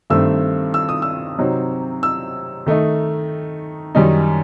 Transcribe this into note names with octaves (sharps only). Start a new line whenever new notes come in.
G2 D#3 A3 C4 E6
E6
D#6
E6
C3 F#3 C4 D#4
E6
D#3 A3 D#4
F#2 D#3 G3 D#4